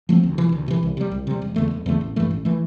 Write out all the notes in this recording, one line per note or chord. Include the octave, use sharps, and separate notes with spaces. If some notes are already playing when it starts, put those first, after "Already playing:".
F3 A3 C4
D2
C3 E3
D2
C3 E3
C2
C3 G3
C2
C3 G3
E1
E2 D3 A3
E1
E2 D3 A3
A1
G2 E3 A3
A1
E3 A3